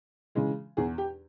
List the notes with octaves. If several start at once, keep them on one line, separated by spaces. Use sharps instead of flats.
C#3 E3 G#3
E2 G#4
G4